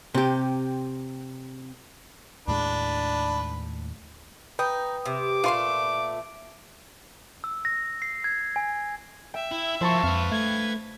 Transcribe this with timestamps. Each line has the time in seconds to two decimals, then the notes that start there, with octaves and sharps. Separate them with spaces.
0.14 C3 G4
2.48 D#2 A2 G#3 D4 B4
4.59 D#4 B4 G5 D#6
5.06 C3 D6
5.44 A#2 A3 F4 C6
7.44 E6
7.65 A#6
8.02 C7
8.24 G#6
8.56 G#5
9.34 E5 G5
9.52 E4
9.81 F3 A#3 E4 C5 A5 C#6
10.03 F2 B4 F5
10.32 A3 G#6